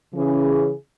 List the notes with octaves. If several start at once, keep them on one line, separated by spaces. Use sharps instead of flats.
C#3 E3 C#4 G#4